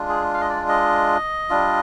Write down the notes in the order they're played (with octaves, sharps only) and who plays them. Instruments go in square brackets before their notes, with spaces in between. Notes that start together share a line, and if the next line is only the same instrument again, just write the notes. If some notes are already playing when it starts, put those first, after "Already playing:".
Already playing: [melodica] G#3 D4 F4
G#4
F5
D#5
D5
D#5
G3 D4 F4